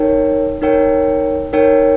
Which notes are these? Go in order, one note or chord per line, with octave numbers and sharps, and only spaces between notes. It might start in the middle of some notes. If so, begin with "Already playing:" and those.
Already playing: D#4 A#4 C#5 G5
D#4 A#4 C#5 G5
D#4 A#4 C#5 G5